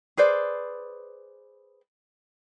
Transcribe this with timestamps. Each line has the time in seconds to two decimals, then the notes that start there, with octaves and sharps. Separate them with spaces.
0.17 G#4 B4 C5 D5